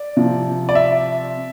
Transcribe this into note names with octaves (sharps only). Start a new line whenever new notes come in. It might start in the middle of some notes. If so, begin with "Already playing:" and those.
Already playing: D5
C3 F3
D5
E5